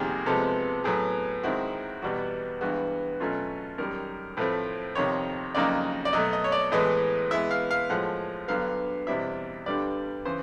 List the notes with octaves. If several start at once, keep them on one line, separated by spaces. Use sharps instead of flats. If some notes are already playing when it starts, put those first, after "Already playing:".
Already playing: F2 C3 D#3 G3 A#3 G#4
C3 F3 G#3 B3 A4
A2 F#3 B3 G#4
D#3 G#3 C4 E4 F#4
E2 B2 G3 B3 F#4
G2 E3 G#3 B3 F#4
B2 F#3 A3 C#4 F4
F#2 D#3 G3 A#4
A2 F3 A3 C4 B4
F2 C3 D#3 C#5
F2 C#3 F#3 A#3 D#4 D5
D5
B2 F#3 A3 D#5
D#5
C#5
D5
A2 E3 G#3 B3 D#5
E3 G#3 B3 E4 E5
F5
F5
A2 F3 G#3 F#5
G2 D3 F#3 B3 F5
E2 B2 G3 C4 E4 E5
G2 D3 G3 B3 D5
C#3 E3 C5